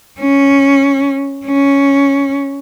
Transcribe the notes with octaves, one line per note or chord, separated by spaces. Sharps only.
C#4
C#4